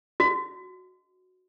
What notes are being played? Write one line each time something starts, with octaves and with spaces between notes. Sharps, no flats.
F#4